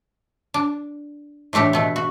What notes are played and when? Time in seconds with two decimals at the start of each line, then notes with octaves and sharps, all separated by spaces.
0.54 D4
1.53 A2 E3 A3 D4 G4
1.73 B2 A3 B3
1.96 F#4